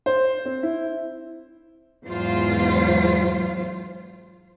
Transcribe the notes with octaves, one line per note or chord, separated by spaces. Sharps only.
C5
C4
E4
E2 G#2 F#3 F4 C5